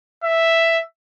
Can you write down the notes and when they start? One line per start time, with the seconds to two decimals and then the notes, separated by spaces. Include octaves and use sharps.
0.24 E5